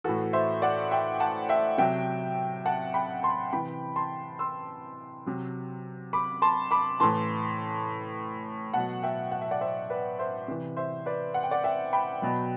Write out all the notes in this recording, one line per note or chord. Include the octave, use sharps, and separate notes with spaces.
A2 E3 F#4 A4
C5 E5
D5 F#5
E5 G5
F#5 A5
E5 G5
C3 F#3 E5 G5
F#5 A5
G5 B5
A5 C6
C3 E3 G5 B5
A5 C6
C6 E6
C3 F#3
B5 D6
A5 C6
B5 D6
A2 E3 A5 C6
B2 F#3 F#5 A5
E5 G5
F#5
E5
D5 F#5
C5 E5
B4 D5
C5 E5
C3 E3
C5 E5
B4 D5
F#5
G5
D5 F#5
E5 G5
G5 B5
B2 F#3